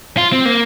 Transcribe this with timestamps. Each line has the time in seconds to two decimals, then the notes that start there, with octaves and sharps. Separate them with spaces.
0.17 F4
0.32 C4
0.45 A#3